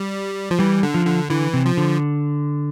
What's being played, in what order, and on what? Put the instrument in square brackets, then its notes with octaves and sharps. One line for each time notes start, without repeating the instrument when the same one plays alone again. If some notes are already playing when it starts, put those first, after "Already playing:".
Already playing: [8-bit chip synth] G3
F3
[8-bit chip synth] E3 [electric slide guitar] G3
[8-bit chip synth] D3
[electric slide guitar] F3
[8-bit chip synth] D3
[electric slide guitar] D3 [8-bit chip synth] E3
[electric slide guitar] C3
[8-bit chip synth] F3
[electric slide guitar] D3